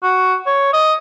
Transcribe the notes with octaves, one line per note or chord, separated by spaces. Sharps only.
F#4
C#5
D#5